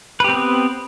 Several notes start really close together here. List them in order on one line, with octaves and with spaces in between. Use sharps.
B4 G4 C4 B3